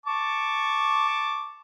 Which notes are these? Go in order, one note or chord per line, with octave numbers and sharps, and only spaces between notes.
A5 C#6 D6